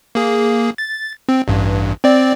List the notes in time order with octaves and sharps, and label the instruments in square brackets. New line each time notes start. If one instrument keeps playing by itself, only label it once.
[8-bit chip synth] A#3 G#4
A6
C4
A1 G2
C4 D5